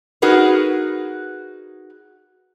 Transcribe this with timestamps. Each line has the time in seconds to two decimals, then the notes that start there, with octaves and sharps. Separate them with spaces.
0.22 D#4 F#4 G#4 A#4 B4